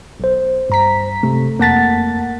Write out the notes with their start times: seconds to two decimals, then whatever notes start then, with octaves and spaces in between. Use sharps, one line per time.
0.20 B1 C5
0.70 G2 A#5 B6
1.23 C3 A3
1.59 F2 A#3 F#5 A5 A6 B6